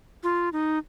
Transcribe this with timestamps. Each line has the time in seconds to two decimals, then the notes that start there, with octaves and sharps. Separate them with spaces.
0.23 F4
0.53 D#4